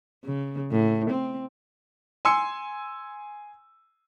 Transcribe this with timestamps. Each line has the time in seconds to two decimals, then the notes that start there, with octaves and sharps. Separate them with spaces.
0.24 C#3
0.71 A2
1.10 C4
2.25 G#5 C6 E6 C#7